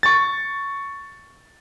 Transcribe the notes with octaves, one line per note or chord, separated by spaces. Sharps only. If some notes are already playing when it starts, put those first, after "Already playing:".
C#6 A6